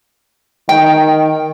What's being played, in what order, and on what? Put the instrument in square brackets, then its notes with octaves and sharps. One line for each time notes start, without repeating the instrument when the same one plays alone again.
[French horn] D#3 [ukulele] G5